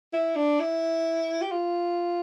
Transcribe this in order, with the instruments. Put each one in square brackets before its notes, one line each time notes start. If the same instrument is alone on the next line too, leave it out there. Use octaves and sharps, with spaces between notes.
[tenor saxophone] E4
D4
E4
G4
F4